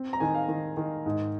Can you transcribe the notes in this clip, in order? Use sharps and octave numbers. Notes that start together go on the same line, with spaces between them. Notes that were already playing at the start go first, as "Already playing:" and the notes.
Already playing: C4
A#5
D#3 G#5
F5
D#3
D#3
G#2